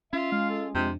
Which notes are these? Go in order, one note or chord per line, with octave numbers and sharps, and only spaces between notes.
C#4 F4 E5
G#3 F5
A4
F2 C3 D4 F4